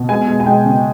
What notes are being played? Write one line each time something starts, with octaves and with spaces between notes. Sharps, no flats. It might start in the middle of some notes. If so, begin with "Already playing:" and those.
Already playing: B2
G#3 G#5
G#3
G#5
G#3 G5
C#3